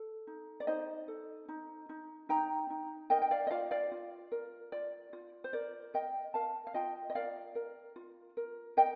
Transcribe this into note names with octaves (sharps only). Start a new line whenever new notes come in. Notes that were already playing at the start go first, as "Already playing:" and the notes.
Already playing: A4
D#4
D5
D#4 C5 D#5
A4
D#4
D#4
D#4 G5 A#5
D#4
A#4 D#5 G5
G5
D5 F5
D#5
F4 D5 F5
D5 F5
F4
A#4
F4 D5
F4
C5
A#4 D5
A#4 D#5 G5
A#4 F5 A5
F5
F4 D#5 G5
D#5
A#4 D5 F5
A#4
F4
A#4
A#4 D#5 G5